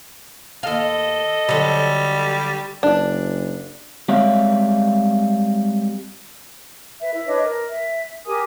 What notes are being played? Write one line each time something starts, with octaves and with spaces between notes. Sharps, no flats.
D#2 A4 D#5 F5
D3 F#3 G3
F#1 D4
G3 G#3 C4 C#5 E5 F5
B4 E5
E4 E5
D4 B4 C#5 D#5
A#4
E5
G4 A#4 G#5 D#6